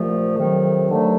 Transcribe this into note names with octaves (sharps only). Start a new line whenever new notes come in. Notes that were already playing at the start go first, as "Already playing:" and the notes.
Already playing: C2 A#2 F3 A3
F2 C3 D#3 F#3
D#2 D3 F#3 A3